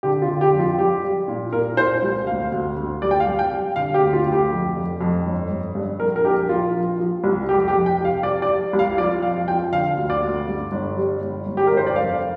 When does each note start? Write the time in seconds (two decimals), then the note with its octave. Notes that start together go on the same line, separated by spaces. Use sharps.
0.03 D3 G4
0.22 F4
0.28 D3
0.41 G4
0.53 F2
0.59 F4
0.78 G3 G4
1.03 G3
1.28 A#2
1.53 A#2 A#4
1.77 A#2 C5
2.03 C2
2.27 D2 F5
2.52 D2
2.77 D2
3.02 G3 D5
3.11 G5
3.20 F5
3.27 G3
3.39 G5
3.52 G3
3.76 D3 F5
3.94 G4
4.01 D2
4.13 F4
4.26 D2
4.32 G4
4.51 F2
4.76 F1
5.01 F2
5.25 G1
5.50 G1
5.75 G2
5.99 A#1 A#4
6.16 A#4
6.25 A#1 G4
6.49 A#1 F4
6.74 F3
6.99 F3
7.24 C2
7.49 F1 G4
7.68 G4
7.74 F2
7.86 G5
7.99 C3
8.05 F5
8.23 G3 D5
8.42 D5
8.48 G3
8.73 C2
8.79 F5
8.98 F3 D5
9.22 F2 F5
9.48 F3 G5
9.72 D3 F5
9.97 D2
10.10 D5
10.22 D2
10.48 G2
10.72 G1
10.97 G3
11.21 G1
11.46 G1
11.57 G4
11.67 G1 A#4
11.77 C5
11.86 D5
11.96 F1 F5